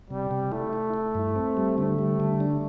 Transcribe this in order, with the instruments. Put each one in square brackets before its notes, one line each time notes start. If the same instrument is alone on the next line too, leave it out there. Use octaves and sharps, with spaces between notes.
[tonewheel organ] C3 [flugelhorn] G3
[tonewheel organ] C3
[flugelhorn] A3 [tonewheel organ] E4
[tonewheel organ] E4
E4
G2
C4
G3
[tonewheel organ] D3 [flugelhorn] A3
[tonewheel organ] G3
D3
D4